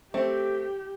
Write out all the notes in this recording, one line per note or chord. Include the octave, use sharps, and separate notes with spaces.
A3 C4 G4